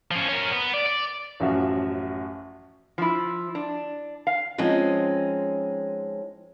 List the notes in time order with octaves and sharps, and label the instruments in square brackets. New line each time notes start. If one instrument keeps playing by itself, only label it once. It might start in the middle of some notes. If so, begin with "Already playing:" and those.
[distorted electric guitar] F3 C#4
C#4 A#4
B3
D5
D5
[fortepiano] A1 F#2 F3 F#4 E5 F5
[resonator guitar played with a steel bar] F3 E4
D4
F5
[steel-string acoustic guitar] F3 G#3 C4 C#4 D#4